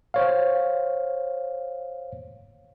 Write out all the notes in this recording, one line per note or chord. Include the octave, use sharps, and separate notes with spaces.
C5 C#5 F5